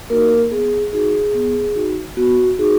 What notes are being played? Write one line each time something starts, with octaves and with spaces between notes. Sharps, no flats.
A#3 D#4 F#4 A#4
B3 G#4
D#4 F#4 G#4
B3
D#4 F#4
B3 F#4
D#4 F#4 G#4